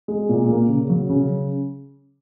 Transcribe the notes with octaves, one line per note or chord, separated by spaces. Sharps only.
G#3
A#2
A#3
C#3
F#3
C#3